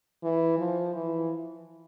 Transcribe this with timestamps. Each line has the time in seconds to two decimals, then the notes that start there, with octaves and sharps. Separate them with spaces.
0.23 E3
0.58 F3
0.94 E3